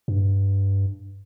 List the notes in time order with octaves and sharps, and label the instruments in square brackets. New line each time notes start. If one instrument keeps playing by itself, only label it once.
[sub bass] G2